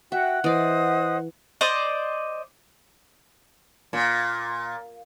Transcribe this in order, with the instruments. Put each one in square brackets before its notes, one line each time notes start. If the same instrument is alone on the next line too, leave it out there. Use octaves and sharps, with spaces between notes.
[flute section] F#4 G5 [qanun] E5 [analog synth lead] F#5
[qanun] E3 D5 [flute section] C5 D#5 D#6
[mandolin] C5 D5 D#5 D#6
[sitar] A#2